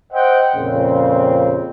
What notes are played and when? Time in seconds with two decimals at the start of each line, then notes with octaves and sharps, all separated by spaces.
0.12 C5 D#5 E5 F#5 G5
0.56 F2 A#2 C#3 C4